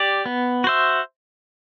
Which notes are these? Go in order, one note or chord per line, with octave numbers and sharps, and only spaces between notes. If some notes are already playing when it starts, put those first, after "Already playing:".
Already playing: G4 D5
B3
F#4 C5 E5